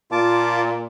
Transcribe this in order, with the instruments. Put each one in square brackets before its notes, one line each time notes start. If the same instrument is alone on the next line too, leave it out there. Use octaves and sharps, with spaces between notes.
[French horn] A#2 [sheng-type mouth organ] F4 A5 D6